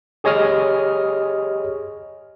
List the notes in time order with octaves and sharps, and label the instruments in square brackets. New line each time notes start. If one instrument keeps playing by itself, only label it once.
[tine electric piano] G4 G#4 C#5 D#5 D#6 F6